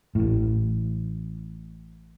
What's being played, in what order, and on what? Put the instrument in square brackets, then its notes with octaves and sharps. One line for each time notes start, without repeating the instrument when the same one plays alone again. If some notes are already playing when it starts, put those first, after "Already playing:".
[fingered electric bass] A1 A2